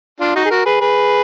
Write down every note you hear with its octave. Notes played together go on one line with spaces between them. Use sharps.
D4 F4
D#4 F#4
G#4
F#4 A#4
G#4 B4
G#4 B4